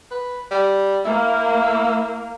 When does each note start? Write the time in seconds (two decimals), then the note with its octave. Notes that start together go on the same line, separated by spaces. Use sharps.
0.11 B4
0.51 G3
1.05 A#3 E4